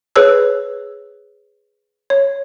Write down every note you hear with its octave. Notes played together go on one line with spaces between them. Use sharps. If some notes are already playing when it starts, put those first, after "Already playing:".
G#4 B4 C#5 E6
C#5